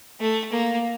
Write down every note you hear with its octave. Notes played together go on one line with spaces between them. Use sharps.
A3
A#3